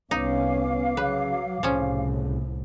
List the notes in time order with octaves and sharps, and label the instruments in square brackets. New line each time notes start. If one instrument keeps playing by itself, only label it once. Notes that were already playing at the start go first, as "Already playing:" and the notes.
[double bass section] C2 C#4 [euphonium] B3 [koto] D#4 [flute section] F5 D6
[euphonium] C#3 [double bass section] F#3 [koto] B4
[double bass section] C2 A2 [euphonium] C#3 [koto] F3 C#4